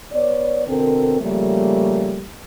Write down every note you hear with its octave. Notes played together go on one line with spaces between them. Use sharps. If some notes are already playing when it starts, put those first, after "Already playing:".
B3 C#5 D5
B2 D3 C4 A4 A#4
C#3 F3 G3 A3 A#3